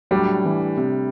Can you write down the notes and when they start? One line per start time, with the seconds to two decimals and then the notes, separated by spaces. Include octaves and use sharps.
0.11 A2 F#3 G3 D4
0.45 E3
0.77 C3